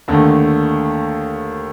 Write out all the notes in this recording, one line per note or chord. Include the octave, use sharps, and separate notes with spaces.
D#2 D3 A3